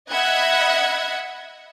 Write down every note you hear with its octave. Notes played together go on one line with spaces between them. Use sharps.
D#5 E5 F#5 B5 F#6 G#6